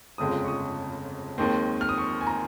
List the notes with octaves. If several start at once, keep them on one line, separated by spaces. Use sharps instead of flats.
G1 F2 C#3 G#3 C4 D#6
C#6
D#6
D#2 D#3 G#3 C4
F6
D#6
C#6
G#5
A#5